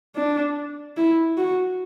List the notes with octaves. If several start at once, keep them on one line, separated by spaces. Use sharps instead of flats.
D4
E4
F#4